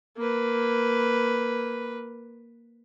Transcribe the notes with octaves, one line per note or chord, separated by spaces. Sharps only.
A#3 B4